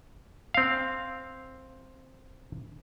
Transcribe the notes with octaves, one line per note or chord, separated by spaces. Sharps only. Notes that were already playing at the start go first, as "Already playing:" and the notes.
C4 F5